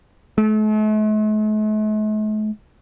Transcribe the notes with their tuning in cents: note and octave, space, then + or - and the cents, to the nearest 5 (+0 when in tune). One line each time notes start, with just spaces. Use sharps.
A3 -45